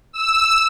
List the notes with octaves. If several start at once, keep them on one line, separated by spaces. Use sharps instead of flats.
E6